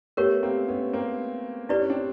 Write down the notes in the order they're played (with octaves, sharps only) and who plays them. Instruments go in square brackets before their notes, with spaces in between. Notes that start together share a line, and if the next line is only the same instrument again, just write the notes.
[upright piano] A3 B3 [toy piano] G4 A#4 C#5
[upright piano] A#3 C4
B3 C#4
A#3 C4
[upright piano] D4 [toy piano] E4 G4 B4 D5
[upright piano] C#4
C4 D4